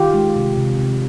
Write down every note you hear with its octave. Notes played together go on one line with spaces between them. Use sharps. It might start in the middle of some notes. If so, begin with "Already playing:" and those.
Already playing: D#3 F4 G4
G#3
C3
C3
C3